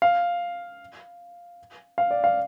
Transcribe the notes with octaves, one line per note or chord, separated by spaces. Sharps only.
F5
F5
D5
F5